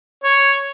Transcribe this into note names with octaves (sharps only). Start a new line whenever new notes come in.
C#5